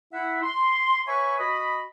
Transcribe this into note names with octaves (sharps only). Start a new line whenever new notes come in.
E4 E5 F#5
C6
B4 C#5 E5 G#5 B5 C#6
F#4 D#5 B5